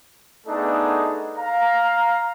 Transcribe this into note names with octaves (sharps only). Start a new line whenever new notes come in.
A3 B3 D4 D#4 G#4 A4
F5 A#5